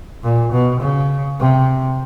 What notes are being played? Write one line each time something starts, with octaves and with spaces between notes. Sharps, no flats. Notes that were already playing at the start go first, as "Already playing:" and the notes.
A#2
B2
C#3
C3